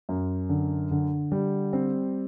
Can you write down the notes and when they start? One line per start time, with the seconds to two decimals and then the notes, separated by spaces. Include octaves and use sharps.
0.09 F#2
0.49 D3
0.91 D3
1.32 G3
1.73 C4